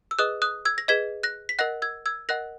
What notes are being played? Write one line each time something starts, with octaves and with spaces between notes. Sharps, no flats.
E6
G#4 B4 D#5 D#6 F#6
D#6 F#6
E6 G#6
A#6
G#4 B4 D#5 G#6 B6
F#6 A#6
B6
A#4 D#5 F#5 F#6 A#6
E6 G#6
E6 G#6
A#4 D#5 F#5 F#6 A#6